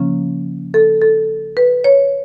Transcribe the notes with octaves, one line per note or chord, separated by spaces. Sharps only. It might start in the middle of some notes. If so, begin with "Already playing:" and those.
Already playing: C#3 F3 A#3 C#4
A4
A4
B4
C#5